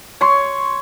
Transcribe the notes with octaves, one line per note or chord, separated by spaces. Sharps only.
C#5 C6